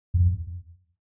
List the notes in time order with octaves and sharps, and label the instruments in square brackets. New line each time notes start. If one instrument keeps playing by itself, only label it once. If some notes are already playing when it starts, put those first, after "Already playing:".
[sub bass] F2